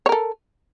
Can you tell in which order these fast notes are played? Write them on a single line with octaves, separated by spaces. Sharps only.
C#5 A#4 A4